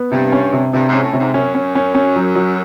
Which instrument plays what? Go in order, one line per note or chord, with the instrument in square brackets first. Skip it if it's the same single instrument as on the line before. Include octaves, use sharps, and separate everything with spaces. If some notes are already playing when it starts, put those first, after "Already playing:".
Already playing: [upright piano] B3
[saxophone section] G2 [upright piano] C3
[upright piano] C#4
C3
[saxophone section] G2 [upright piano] C3
[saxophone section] G#2 [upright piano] C#4
[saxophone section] A2
[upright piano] C3
[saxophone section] G#2
[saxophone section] F#2 [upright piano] C#4
[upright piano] C#4
C#4
C#4
F#3
F#3